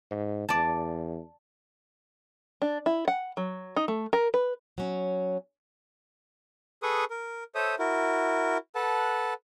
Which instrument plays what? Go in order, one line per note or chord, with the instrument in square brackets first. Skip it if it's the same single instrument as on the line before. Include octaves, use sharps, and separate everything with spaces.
[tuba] G#2
[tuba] E2 [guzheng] D5 A5
[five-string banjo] D4
E4
F#5
F#3
D#4
A3
A#4
B4
[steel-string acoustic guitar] F#3 C#4
[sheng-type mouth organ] G#4 A4 B4 C#6 D#6
A#4
A4 C5 C#5 E5 D#6
E4 F#4 A#4
A4 B4 F#5 A5